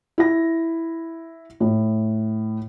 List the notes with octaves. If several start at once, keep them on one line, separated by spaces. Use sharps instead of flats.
E4 A#6
A2